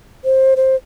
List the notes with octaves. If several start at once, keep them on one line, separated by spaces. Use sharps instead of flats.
C5
C5